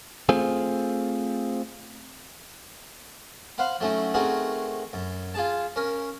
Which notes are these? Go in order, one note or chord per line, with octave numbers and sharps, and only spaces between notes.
A3 C4 F4 G#4
C5 F5 F#5 B5
F#3 A3 C#4 D#4 E4
A3 C4 D#4 F#4 G#4 A#4
F#2
F4 G#4 A5
C#4 A#4